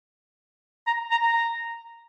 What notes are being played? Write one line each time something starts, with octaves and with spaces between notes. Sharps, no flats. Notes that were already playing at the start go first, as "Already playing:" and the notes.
A#5
A#5
A#5